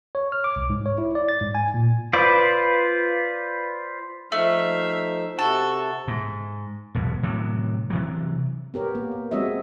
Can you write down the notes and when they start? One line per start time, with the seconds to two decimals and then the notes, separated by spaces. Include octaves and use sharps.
0.15 C#5
0.32 F6
0.44 D6
0.56 C2
0.70 G#2
0.86 C#5
0.98 E4
1.15 D5
1.29 A6
1.41 G#2
1.55 G#5
1.74 A#2
2.13 F4 B4 C5 D5
4.32 F3 A3 D#4 E5 F5
5.39 C3 F#4 A4
6.08 G#2
6.95 E1 B1 G2
7.23 A2 C3 D#3 F#3
7.90 C3 E3 F#3
8.74 B3 G4 A#4 C#5
8.95 A#3
9.12 B3
9.31 G#3 C4 F#4 C#5 D#5 E5